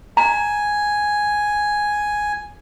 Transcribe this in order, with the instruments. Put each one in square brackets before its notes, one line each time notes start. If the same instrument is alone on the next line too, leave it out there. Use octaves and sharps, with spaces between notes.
[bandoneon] G#5 [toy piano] A#5